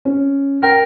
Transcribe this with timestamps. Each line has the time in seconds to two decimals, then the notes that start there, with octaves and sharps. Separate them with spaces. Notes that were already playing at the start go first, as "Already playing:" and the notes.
0.05 C#4
0.63 A#4 G5